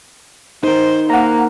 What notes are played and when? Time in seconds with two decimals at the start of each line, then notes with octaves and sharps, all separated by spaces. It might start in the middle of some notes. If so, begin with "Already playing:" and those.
0.63 D#4 A#4 C5
1.10 A#3 F#5 A#5